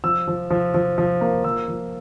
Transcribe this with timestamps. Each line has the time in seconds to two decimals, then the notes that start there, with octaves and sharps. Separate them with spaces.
0.04 F3 E6
0.28 F3
0.50 F3
0.74 F3
0.98 F3
1.21 A#3
1.44 F3 E6
1.68 F3